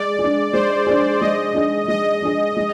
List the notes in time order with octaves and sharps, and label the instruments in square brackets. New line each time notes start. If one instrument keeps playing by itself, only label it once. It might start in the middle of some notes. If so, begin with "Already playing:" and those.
Already playing: [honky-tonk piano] G#3 [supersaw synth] D5
[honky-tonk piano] G#4
D4
[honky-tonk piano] G#3 [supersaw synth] C5
[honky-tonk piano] D4 G#4
[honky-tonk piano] G#3 [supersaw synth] D#5
[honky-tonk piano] D4 G#4
[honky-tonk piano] G#3 [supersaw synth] D#5
[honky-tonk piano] D4 G#4
G#3